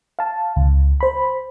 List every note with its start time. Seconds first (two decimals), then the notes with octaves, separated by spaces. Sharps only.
0.19 F5 A5
0.56 C#2
1.01 C5 B5